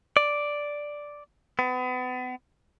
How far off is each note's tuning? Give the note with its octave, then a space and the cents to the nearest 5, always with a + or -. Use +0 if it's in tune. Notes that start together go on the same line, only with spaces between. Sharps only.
D5 +0
B3 +35